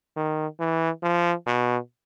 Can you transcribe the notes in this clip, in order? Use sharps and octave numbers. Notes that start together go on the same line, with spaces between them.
D#3
E3
F3
B2